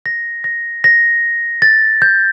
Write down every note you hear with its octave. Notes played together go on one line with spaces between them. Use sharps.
A#6
A#6
A#6
A6
G6